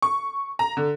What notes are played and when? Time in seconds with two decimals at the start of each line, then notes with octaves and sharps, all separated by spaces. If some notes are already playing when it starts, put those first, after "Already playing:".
0.02 C#6
0.59 A#5
0.77 D3